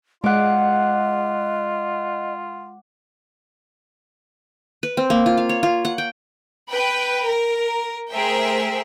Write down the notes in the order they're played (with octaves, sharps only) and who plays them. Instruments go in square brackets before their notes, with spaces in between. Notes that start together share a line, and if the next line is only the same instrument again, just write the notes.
[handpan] G#3 [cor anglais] F4 [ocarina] D#5 [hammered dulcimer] F#5 D6
[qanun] B4
C4
A#3
F4
F5
C#5
F4
F#5
G5
[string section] B4 G5 B5
A#4
A3 G#4 A#4 C5 E5 G5